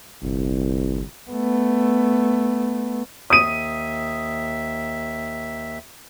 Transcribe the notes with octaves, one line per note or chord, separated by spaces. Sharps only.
G1 C2
A3 B3
D#2 E5 D#6 D#7